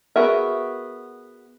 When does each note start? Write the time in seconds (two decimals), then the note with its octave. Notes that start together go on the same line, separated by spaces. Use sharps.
0.16 B3 F#4 G#4 A#4 E5